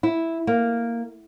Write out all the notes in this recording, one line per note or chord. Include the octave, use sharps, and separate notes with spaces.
E4
A#3